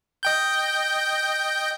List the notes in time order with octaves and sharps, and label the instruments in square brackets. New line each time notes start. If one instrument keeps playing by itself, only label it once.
[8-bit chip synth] D#5 G5 G6